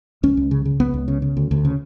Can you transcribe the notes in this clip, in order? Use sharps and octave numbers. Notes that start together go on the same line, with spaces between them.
C#2 C#4
C#2
C#3
C#3
C#2 B3
C#2
C#3
C#3
D2
D2
C#3